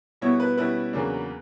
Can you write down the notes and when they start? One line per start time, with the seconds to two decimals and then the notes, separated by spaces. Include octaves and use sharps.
0.21 B2 G3 B3 E4 C#5
0.40 B4
0.57 B2 G3 C#4 E4 B4
0.93 E2 C#3 F#3 A#3 D4